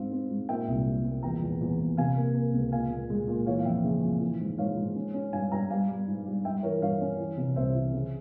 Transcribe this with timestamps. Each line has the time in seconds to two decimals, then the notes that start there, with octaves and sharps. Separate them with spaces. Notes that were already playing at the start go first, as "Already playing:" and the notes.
Already playing: G#2 C4 F5
0.12 C4
0.30 G#2
0.49 A#2 E5 G5
0.68 C2
0.86 G3
1.05 A#2
1.23 E2 G5 A#5
1.43 E2
1.61 E2
1.79 E2
1.97 C3 F5 G#5
2.17 A#3
2.35 A#3
2.54 C#2
2.72 A#2 F5 G#5
2.90 A#2
3.10 G#3
3.28 A#2
3.46 E3 C#5 F5
3.59 F5
3.65 F2 E5 G5
3.84 C#3
4.03 F2
4.21 E3
4.40 G#2
4.58 G#2 C#5 F5
4.77 G#2
4.96 C#4
5.14 C#4
5.33 G2 F5 G#5
5.52 G2 G5 A#5
5.70 G3 F5 G#5
5.89 G3
6.07 G#2
6.26 G3
6.45 G2 E5 G5
6.63 E3 A#4 C#5
6.81 G2 C#5 F5
7.01 C#4
7.19 E3
7.37 C3
7.56 C2 C5 E5
7.75 E3
7.94 C#3